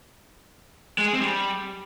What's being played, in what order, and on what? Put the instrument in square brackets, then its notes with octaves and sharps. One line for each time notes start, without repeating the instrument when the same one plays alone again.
[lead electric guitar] G#3
G#4
C4
G3